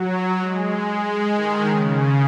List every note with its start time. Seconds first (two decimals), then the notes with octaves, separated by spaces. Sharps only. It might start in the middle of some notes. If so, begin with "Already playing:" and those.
Already playing: F#3
0.40 G#3
1.04 G#3
1.34 D#3
1.67 C#3